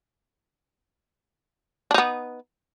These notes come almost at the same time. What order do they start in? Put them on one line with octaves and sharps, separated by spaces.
D4 D#4 B3